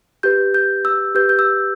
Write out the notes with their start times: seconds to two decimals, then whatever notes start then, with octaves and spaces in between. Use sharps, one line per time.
0.23 G4 B4 G6
0.54 G6
0.85 E6
1.15 G4 B4 G6
1.29 G6
1.39 E6